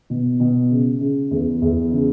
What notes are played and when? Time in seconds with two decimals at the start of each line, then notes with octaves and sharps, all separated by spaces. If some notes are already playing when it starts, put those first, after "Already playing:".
0.10 B2
0.40 B2
0.71 C#3
1.01 C#3
1.31 E2
1.62 E2
1.92 C#3